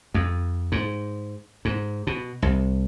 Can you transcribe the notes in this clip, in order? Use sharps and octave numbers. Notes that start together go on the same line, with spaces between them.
F2
G#2
G#2
B2
C2